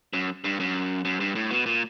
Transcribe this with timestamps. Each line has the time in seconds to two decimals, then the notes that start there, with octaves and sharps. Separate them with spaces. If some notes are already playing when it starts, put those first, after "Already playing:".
0.13 F#2
0.44 G2
0.60 F#2
1.05 F#2
1.20 G2
1.35 A2
1.51 B2
1.66 A#2